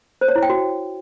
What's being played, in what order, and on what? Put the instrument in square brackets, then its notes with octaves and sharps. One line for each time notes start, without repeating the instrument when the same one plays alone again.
[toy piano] C5
C#5
E4
G5
F#4